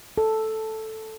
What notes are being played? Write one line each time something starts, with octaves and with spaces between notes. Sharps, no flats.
A4